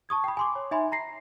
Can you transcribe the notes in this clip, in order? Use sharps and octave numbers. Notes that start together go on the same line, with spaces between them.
A5 C#6 D#6 G#6
G5 B5
G#5 C6 D6
C#5
D#4 E5 G#5 B5 C6
A#5 A#6 C7